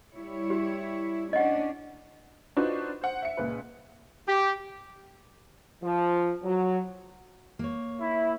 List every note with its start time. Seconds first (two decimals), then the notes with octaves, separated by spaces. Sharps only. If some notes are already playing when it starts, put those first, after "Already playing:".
0.16 G3 E4 C#5
0.50 G4
1.33 C#4 D4 D#5 F#5
2.57 D4 D#4 F4 F#4 B4 C5
3.01 C5 F#5
3.22 E5 C#7
3.37 C#2 A#2 B4
4.27 G4
5.83 F3
6.44 F#3
7.59 A#3 C#5
8.01 E4